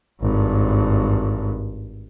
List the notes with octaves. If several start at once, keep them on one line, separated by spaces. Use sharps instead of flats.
G#1 G2